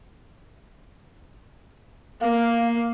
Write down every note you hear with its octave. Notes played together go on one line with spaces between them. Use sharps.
A#3 F5